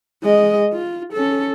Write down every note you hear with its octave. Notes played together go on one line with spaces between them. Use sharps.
G#3 D#5
F4
C#4 A4